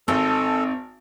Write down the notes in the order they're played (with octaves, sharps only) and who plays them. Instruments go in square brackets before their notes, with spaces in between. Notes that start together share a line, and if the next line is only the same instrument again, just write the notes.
[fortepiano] G#1 [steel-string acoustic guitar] C4 D#4 [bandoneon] A4